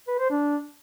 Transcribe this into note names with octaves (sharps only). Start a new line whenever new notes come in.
B4
C5
D4